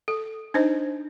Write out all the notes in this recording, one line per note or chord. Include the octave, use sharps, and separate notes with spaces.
A4
D4 D#4 C5 D#5